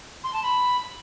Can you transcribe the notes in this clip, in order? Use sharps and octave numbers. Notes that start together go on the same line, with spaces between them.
C6
A5
B5